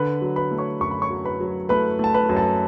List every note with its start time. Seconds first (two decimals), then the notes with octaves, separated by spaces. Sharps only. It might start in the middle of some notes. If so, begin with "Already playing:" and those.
Already playing: D3 B4 B5
0.22 F#3
0.36 B4 B5
0.51 A3
0.58 C#5 C#6
0.81 F#2 C#6
0.91 B5
1.02 C#5 C#6
1.10 F#3
1.25 B4 B5
1.40 F#3
1.69 A3 B4 B5
1.99 A3 A5
2.14 B4 B5
2.29 F#2
2.36 A4 A5